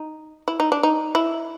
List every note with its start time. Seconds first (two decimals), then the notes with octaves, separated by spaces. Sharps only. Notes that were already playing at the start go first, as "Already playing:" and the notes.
Already playing: D#4
0.48 E4
0.60 D#4
0.72 D4
0.83 D#4
1.15 E4